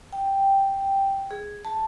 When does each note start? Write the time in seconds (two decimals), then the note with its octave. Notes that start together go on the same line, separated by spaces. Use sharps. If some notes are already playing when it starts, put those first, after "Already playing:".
0.13 G5
1.31 G#4
1.65 A5